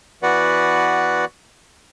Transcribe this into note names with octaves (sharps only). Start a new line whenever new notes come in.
E3 B3 F#4 B4 D5 F#5